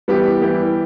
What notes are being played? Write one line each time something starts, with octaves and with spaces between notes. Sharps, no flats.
E3 G3 B3 E4 G4
E3 G3 B3 E4 G4